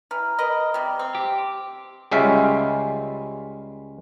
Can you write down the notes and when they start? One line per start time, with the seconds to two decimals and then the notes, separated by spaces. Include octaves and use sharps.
0.11 E3 A#5 F6
0.39 A#4 B4 D#5
0.74 C3 G3
0.99 C4
1.15 G4
2.11 C#2 G3 G#3 C#4 E5 F5